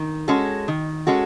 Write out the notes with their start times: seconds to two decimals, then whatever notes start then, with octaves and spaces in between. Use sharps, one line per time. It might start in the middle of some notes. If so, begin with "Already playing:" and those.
Already playing: D#3
0.28 G#3 C#4 F#4 A4
0.68 D#3
1.07 G#3 C#4 F#4 A4